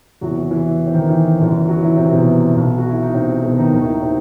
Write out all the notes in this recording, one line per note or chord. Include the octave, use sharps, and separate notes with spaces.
F#1 E2 C3 E3 F#3 F#4
F#3 F#4
E3 E4
C4
D#3 D#4
E3 E4
G1 F#2 E3
F#3 F#4
E3 E4
C3 C4
B2 B3
B1 B2
F#4
E4
D#4
C3 C4
B2 B3
D#3 D#4
D#2 D#3 F#4
E4
D#4
C3 C4